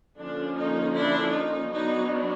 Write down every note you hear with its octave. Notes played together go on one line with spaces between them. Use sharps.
D3 F3 A#3 C#4 D4
D#4
D4 E4
D#4
F#3 B3 D4 D#4